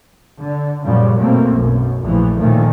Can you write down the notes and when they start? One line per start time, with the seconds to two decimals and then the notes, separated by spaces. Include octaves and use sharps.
0.39 D3
0.85 F#2 A#2 C#3 F3 G3
1.20 B2 A3 A#3 C4
1.53 B1 F#2
2.03 A#1 A2 E3 F3
2.39 D#2 A#2 D3 D#3 F3 A3